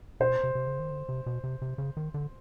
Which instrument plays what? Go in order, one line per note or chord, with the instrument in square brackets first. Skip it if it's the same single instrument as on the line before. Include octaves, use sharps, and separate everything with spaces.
[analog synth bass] B2 [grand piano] C5
[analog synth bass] C3
C3
C#3
D#3
D3
C3
B2
C3
C3
C#3
D#3
D3